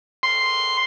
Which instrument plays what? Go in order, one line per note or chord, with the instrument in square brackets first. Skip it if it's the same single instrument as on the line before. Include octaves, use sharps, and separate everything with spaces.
[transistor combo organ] C6